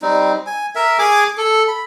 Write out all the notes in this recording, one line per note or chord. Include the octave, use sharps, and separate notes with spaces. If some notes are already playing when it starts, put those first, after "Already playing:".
G3 C4 D#4
G#5
A#4 E5
G#4 G#5 D6
A4
B5